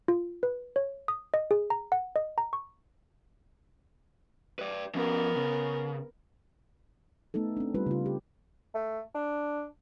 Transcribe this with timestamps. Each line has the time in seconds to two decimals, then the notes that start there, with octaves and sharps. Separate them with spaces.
0.08 F4
0.43 B4
0.76 C#5
1.08 D#6
1.34 D#5
1.51 G#4
1.70 A#5
1.92 F#5
2.16 D#5
2.38 A#5
2.53 C#6
4.59 B4 D5
4.95 F3 B3 C#4 A#4
5.36 C#3
7.34 A3 B3 D#4 A4
7.57 C4 D4
7.74 G3 F4 B4
7.86 C#3 F4
8.06 G4
8.75 A3
9.15 D4